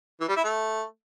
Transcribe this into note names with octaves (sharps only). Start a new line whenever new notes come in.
E3
G3
E4
A3